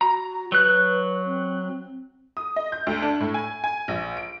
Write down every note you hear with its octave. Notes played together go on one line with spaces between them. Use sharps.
F#4 A#5
F#3 B4 F#6
C4
D#6
D#5
G6
D2
D4
A2
G#5
G#5
A#1
D7